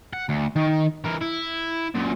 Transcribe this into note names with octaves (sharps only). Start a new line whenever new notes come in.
F#5
D2
D#3
E3 A#4
E4
F#2 A#2